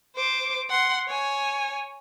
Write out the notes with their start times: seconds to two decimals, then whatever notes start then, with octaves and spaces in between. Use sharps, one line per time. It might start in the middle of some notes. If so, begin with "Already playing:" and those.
0.16 C5 D6
0.70 F#5 C6
1.08 C#5 G#5